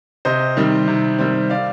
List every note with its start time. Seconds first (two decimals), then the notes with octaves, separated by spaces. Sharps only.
0.25 C3 C5 D#5
0.57 D#3 G3 C4
0.88 C3
1.19 D#3 G3 C4
1.50 D5 F5